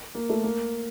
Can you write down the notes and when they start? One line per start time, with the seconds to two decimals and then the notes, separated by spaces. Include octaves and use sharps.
0.15 A#3
0.30 A3
0.44 A#3